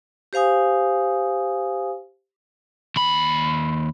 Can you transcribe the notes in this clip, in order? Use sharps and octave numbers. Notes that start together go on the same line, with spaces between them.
G4 C5 F5 G#5 D#6
D#2 B5